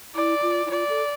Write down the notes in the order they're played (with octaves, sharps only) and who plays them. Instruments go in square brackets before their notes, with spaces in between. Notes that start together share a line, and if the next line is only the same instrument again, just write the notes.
[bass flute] E4 [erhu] D5
[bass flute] F4
E4
[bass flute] F4 [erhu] D5
[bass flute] A4